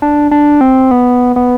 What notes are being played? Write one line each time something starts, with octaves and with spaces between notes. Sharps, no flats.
D4
D4
C4
B3
B3